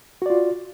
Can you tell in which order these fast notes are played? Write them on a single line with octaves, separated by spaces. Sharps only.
F#4 D5 F4